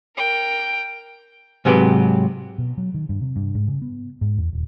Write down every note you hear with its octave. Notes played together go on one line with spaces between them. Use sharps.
A#4 G5
G#2 C3 F#3 G4 B4
B2
F#3
D#3
G2
C3
G2
G#2
C#3
B3
G#2
E2
D#1